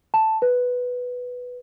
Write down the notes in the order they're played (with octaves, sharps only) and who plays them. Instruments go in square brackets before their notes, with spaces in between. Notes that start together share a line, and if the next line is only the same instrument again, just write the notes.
[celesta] A5
B4